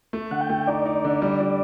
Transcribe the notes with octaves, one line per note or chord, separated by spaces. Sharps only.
A3
D3 F#5
G5
A3
D#4 D5
D#4
D3
G3
G3